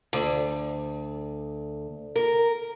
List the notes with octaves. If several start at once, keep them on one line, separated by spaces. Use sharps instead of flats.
D2
A#4